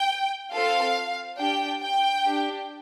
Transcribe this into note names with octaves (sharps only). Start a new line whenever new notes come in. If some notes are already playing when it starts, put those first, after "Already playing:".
Already playing: G5
C4 F4 A4 F5
D4 G4 G5
G5
D4 G4